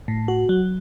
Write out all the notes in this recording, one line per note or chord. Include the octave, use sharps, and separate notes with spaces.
A2
F#4
F#3